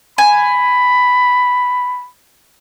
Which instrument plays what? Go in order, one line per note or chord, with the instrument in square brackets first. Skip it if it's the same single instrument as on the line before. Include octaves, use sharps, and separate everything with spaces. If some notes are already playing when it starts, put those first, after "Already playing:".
[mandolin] G#5 [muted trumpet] B5